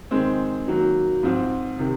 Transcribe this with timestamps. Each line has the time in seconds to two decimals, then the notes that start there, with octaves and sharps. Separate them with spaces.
0.11 D#3 G#3 C4
0.68 D#3 F#3 A#3
1.23 G#2 F3 C4
1.79 C3 D#3